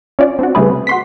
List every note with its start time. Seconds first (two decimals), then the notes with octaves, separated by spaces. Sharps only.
0.19 C#4 F4 D5
0.39 C4 D4 F#4
0.55 C#3 G3 A3 G#4 B4
0.69 C3
0.87 F#4 C6 B6